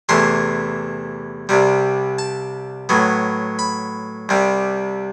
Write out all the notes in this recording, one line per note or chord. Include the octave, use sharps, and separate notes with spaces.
E2 C3 E3 A3 C6
C2 C3 G3
A5
A2 F#3 B3
B5
C2 C3 G3